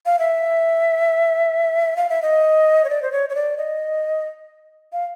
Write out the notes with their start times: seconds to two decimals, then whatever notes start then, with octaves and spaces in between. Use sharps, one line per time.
0.06 F5
0.19 E5
1.97 F5
2.10 E5
2.22 D#5
2.84 C#5
2.90 D5
3.02 C5
3.12 C#5
3.29 C#5
3.35 D5
3.57 D#5
4.93 F5